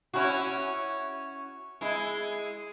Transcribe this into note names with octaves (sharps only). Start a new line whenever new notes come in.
C#4 E4 F#4
G#3 E4